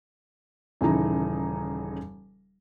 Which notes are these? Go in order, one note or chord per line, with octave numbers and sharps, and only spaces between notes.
D#1 C#3 E3 D#4 A#5